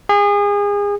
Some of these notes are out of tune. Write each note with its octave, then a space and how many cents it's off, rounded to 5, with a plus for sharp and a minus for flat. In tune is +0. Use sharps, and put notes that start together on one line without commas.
G#4 -30